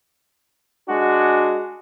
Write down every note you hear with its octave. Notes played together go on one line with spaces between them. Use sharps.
G#3 D4 F#4